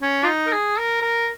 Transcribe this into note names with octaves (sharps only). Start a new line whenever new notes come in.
C#4
F4
D#4
A#4
G#4
A#4
A#4